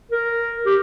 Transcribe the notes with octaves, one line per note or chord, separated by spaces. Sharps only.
A#4
G4